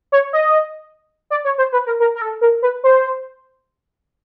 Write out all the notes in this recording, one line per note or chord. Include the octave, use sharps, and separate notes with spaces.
C#5
D#5
D5
C#5
C5
B4
A#4
A#4
A#4
A4
A#4
B4
C5